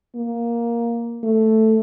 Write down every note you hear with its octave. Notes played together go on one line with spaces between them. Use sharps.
A#3
A3